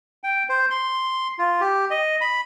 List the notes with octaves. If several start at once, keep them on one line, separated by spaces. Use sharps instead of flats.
G5
C5
C6
F4
G4
D#5
B5